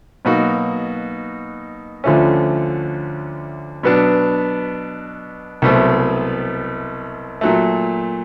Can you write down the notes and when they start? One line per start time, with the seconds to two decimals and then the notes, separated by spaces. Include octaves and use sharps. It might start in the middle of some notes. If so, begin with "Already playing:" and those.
0.25 B2 F#3 A#3 D#4 F#4
2.04 D2 D3 F3 A3 C#4
3.83 B2 F#3 B3 D4
5.62 C2 B2 F#3 A3 C4
7.41 A#2 F#3 A3